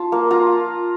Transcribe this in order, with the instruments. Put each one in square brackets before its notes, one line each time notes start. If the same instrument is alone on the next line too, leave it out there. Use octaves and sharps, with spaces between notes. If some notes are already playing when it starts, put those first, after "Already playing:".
Already playing: [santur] F4 A5
A#3
F4 A#5